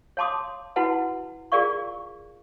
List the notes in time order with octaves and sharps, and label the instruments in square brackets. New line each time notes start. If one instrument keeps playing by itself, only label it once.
[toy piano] C#5 F5 A5 C6 D6 D#6
E4 F#4 B4 F#5 A5
F4 G#4 A#4 D5 F5 C#6